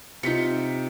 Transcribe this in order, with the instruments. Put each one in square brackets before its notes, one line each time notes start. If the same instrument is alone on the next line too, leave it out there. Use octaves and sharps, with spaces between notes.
[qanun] C3 F4 [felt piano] D#4 B6 C#7